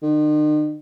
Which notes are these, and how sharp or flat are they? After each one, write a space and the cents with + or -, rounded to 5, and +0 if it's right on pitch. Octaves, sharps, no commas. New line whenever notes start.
D#3 -45